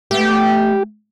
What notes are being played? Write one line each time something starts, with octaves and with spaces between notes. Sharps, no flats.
A3 B3 G4